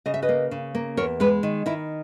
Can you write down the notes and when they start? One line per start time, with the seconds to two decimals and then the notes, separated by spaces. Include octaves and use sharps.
0.06 C#3 D#5
0.14 E5
0.22 B4 D#5
0.29 A#3
0.51 C#3
0.75 A#3
0.97 E2 A#4 C#5
1.20 G#3 G#4 B4
1.43 D#3
1.66 D#3 E4